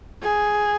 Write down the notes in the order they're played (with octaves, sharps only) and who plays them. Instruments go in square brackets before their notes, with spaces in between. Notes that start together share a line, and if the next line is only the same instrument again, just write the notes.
[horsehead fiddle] G#4